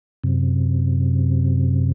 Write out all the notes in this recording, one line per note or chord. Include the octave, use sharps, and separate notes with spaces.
F#2 C3